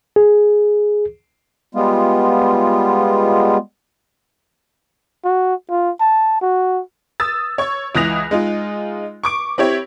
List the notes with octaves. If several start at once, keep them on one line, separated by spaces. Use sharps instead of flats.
G#4
G3 G#3 B3 F4
F#4
F4
A5
F#4
D#6 E6 A6
C#5 C#6
C#2 E3 D#6 F#6 A#6 F7
G#3 D#4 F4
C#6 D6 D7
C4 E4 G4 C#5